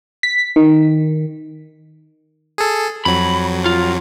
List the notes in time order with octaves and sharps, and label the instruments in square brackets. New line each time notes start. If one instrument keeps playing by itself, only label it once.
[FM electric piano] B6
D#3
[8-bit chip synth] G#4 A4
[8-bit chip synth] F2 F#3 [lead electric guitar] B5
[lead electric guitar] F4